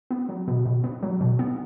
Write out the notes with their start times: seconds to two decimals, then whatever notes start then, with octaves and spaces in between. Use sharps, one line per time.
0.11 B3
0.29 F#3
0.48 B2
0.66 B2
0.84 B3
1.03 F#3
1.21 B2
1.39 B3